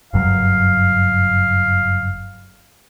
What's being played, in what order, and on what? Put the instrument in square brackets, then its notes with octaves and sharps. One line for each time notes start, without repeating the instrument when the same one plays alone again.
[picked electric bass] F#1 G2 F#3 [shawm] F5